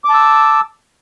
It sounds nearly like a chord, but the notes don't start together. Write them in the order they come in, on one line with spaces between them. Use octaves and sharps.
D6 A5 E6